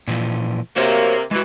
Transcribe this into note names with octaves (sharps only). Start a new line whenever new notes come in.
A#2 E3 F3
C3 A#3 F#4 C5 C#5
E3 G#3 F#4